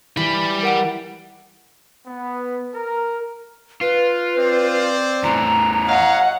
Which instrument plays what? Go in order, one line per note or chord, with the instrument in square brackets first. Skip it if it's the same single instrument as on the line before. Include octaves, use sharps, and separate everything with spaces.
[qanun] E3 [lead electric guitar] G3 B5
[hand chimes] A#4 F#5 D7
[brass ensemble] B3
A#4
[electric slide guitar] F4 [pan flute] B4
[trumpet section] C4 C5 D5
[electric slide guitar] E2 E3 A3 [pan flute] A#5
[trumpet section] C#5 D#5 F5 [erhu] F#5